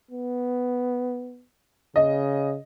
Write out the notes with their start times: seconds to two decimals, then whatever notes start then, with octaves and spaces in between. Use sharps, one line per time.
0.11 B3
1.96 C#3 D#5